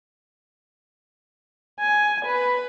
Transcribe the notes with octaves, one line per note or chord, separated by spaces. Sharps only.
G#5
B4